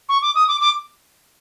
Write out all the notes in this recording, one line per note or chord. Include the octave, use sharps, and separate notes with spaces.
C#6
D6
D#6
D6
D6